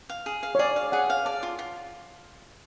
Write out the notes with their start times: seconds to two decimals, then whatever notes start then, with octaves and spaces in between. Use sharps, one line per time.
0.09 F5
0.26 G#4
0.43 F5
0.55 C#5
0.59 G#4 D5
0.76 F5
0.92 G#4 F#5
1.10 F5
1.25 D5 A5
1.43 F4
1.59 F4